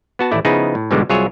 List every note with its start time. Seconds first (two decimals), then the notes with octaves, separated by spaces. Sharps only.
0.19 B3 F#4 A5
0.31 A1 D#2 A3 E4 D5
0.45 C#3 F3 B3 D#4 E4 G#4
0.75 A2
0.91 G#2 B2 D3 E3 G3 G#3
1.09 C2 F#3 F4 G#4 C#5 E5